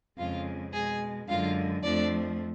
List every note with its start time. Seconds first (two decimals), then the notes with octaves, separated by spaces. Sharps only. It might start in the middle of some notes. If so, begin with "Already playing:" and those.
0.18 F2 C#3 G#3 F4 F5
0.73 B2 G#3 G#4 G#5
1.28 F#2 D3 G#3 F4 F5
1.83 F2 F3 A3 D4 D5